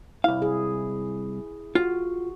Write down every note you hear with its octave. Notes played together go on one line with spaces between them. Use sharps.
C2 E4 F5
G#4
F4 F#4